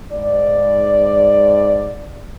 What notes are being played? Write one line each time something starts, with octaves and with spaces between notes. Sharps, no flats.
G#2 D5